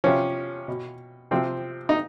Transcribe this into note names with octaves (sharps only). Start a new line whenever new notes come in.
C3 F3 C#4
B2
C3 F3 C4
D#4